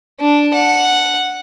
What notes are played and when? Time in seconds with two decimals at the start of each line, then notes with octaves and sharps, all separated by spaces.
0.20 D4
0.54 F#5